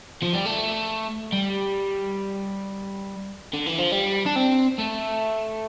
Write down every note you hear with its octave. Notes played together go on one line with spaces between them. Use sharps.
F3
G3
A3
G3
D3
E3
F3
G3
D4
C4
A3